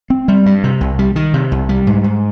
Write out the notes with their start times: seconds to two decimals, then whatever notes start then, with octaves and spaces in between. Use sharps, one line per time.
0.10 C4
0.28 G3
0.46 G2
0.64 C3
0.81 C2
0.99 G3
1.16 D#3
1.34 C3
1.52 C2
1.69 G3
1.87 G#2
2.04 G#2